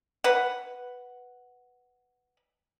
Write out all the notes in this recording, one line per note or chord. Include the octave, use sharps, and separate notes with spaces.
B4 F#5